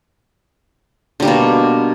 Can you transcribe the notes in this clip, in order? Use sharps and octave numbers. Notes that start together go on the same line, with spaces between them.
B2 D3 G3 A#3